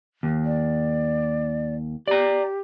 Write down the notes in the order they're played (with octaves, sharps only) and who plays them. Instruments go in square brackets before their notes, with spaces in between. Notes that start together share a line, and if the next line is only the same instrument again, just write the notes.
[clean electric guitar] D#2
[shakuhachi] D5
[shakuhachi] G4 [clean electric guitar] D5 A#5